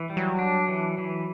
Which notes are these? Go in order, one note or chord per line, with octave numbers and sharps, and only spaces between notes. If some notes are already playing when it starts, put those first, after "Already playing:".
Already playing: E3
G3
F#3
D4
E3
E3